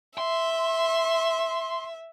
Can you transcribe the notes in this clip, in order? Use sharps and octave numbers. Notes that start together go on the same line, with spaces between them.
E5 C6